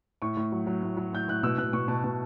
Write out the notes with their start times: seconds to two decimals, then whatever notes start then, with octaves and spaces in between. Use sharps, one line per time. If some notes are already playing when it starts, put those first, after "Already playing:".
0.22 A2 C#6
0.37 A2
0.52 F#3
0.67 F#3
0.83 A2
0.97 F#3
1.13 A2 G6
1.28 A2 F#6
1.43 B2 E6
1.58 B2 F#6
1.73 B2 C#6
1.88 B2 A5
2.04 B2